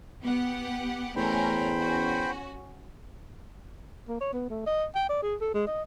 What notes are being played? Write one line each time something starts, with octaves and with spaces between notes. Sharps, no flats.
B3 G4 F#5
E2 A3 C#4 A#4 C5 G5 B5
C#4 F#4
A#3
C#5
B3
A3
D#5
G5
D5
G#4
A4
G#3
D#5